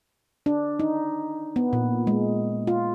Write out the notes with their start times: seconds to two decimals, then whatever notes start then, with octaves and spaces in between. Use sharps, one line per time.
0.46 D4
0.80 D#4
1.56 B3
1.73 A#2
2.07 G#3
2.67 F4